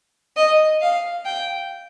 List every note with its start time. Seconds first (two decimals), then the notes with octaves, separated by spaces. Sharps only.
0.37 D#5
0.81 F5
1.26 G5